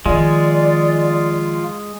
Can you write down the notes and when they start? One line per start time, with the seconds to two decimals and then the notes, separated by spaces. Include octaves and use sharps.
0.06 D#3 F3 G#3 F4 D5